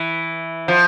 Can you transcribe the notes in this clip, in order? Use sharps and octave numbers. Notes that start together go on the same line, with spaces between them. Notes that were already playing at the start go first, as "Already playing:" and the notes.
Already playing: E3
F3